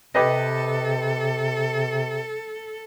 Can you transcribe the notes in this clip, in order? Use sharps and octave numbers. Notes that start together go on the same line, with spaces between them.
C3 G4 A4 B4 D#5